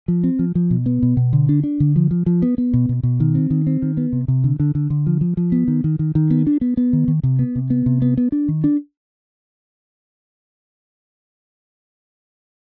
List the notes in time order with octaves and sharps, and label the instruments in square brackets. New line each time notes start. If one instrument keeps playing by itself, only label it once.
[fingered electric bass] F3
C4
F3
F3
B2
B3
B2
B2
D3
D4
D4
D3
F3
F3
F3
B3
B3
B2
B2
B2
D#3
C4
D#3
C4
D#3
B3
C3
C3
D3
D3
D3
D3
F3
F3
F3
B3
D#3
D#3
D#3
D#3
B3
D4
B3
B3
D#3
D#3
C3
B3
C3
B3
C3
B3
B3
D4
D#3
D4